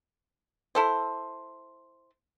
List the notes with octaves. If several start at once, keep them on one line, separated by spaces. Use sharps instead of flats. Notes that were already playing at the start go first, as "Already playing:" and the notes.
E4 A4 C5